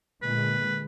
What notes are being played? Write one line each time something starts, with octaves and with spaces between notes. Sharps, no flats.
A#2 D3 G#3 B4